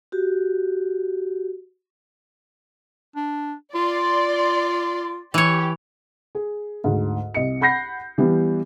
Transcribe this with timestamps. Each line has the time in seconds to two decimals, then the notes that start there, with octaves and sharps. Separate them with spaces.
0.12 F#4 G4
3.16 D4
3.75 F4 D5 C6
5.34 E3 G4 C#5
6.35 G#4
6.84 D2 G#2
7.34 C2 D#5 C#7
7.61 F#5 B5 G6 A#6 C7
8.18 E3 G3 B3